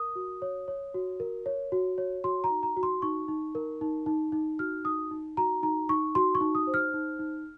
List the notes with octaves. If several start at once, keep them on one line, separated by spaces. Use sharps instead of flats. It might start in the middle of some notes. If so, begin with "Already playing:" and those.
Already playing: A#4 D#6
F#4
C#5
C#5
F#4
A#4
C#5
F#4
C#5
F#4 C6
A#5
D#4
A#5
F#4
C6
D#4 C#6
D#4
A#4
D#4
D#4
D#4
F#4 F6
D#4 D#6
D#4
F#4 A#5
D#4 A#5
D#4 C#6
F#4 C6
C#6
D#4
D#6
C5
F6
D#4
D#4